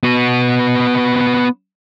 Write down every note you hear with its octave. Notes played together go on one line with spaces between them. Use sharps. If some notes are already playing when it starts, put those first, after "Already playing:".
B3 F#4